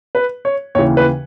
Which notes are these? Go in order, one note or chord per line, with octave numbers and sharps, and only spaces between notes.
B4
C#5
D#2 C#3 E3 C#5
B4